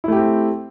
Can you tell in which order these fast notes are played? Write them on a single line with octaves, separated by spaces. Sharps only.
E4 A3 G4 C4